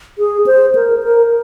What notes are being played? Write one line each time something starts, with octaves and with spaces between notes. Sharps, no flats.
G#4
C5
A#4
A#4